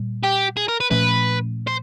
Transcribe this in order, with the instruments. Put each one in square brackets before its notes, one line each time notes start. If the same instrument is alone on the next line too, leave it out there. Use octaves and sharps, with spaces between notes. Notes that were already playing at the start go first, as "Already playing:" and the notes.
Already playing: [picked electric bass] A#2 G3
[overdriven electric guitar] G4
G#4
A#4
B4
[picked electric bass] A#2 F3 A3 C#4 [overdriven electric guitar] B4
[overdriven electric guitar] C5